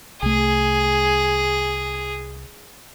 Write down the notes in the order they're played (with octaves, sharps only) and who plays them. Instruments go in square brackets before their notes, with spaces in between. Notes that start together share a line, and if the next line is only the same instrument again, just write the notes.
[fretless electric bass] C2 A3 [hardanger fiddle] G#4